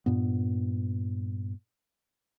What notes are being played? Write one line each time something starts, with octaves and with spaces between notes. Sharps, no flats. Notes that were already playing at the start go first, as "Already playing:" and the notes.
G2 A#2 B3